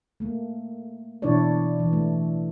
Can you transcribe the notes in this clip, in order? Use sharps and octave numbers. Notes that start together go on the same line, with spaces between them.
A3 A#3
B2 E3 D4 E4 C#5 D5
E3
A3